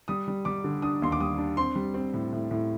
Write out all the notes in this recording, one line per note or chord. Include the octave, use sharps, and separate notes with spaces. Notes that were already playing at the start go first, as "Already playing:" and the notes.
G3 D#6
G3
G3 D6
D3
D4 D#6
D#2 C6
D6
G3 D#6
D4
C4 C6
G3
C4
A2
A2
A2